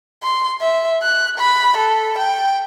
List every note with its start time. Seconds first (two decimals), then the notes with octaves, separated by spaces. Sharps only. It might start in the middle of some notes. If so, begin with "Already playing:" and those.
0.23 C6
0.61 E5
1.03 F#6
1.38 B5
1.77 A4
2.18 G5